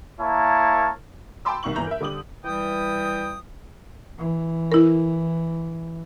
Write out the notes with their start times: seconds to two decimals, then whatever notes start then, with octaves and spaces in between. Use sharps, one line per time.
0.21 A#3 E4 A#4 C#5 A5
1.45 G5 A5 B5 C6 D6 E6
1.63 C2 D#3 C#6 F#7
1.75 G1 E3 A#5 G6
1.87 A#4 E5
2.01 D3 G3 D6 D#6 F#7
2.45 E3 G3 G5 D#6
4.18 E3
4.72 E4 A#4